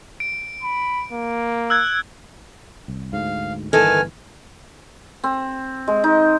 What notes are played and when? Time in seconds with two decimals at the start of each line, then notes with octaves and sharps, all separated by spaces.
0.20 D7
0.63 B5
1.12 A#3
1.70 E6 F#6 G#6
2.88 C2
3.13 D2 G#2 F5
3.73 G1 D#3 E3 B3 A4 G#5 F6
5.24 C4
5.87 G#3
6.04 D#4